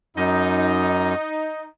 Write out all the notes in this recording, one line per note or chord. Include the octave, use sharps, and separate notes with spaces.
F#2 D#4